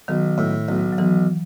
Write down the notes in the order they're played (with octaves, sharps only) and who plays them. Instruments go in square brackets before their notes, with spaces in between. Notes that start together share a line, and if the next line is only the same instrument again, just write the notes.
[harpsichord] B1 [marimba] D#3
[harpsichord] A2
B1
[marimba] F#3
[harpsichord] B1 [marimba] E3